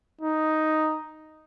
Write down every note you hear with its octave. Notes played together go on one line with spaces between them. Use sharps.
D#4